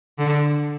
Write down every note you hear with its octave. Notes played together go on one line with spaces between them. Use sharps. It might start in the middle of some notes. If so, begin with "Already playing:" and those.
D3